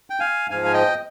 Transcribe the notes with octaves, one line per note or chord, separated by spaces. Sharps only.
G5
F5 G#5
G#2 F3 F5 G#5
G#5
D#5 G5